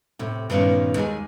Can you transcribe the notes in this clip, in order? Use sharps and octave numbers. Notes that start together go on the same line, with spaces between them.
A2 C3
G2 A#2 D#3 G3 B3 C#4
D#2 G#3 G#4 G#5